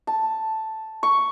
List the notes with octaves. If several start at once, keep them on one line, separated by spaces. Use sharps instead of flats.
A5
C#6